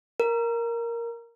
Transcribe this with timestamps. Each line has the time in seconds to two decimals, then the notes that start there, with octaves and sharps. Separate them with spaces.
0.20 A#4